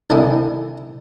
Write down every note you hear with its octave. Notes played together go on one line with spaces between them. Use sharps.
C2 D3 D#3 C4 E4 G#5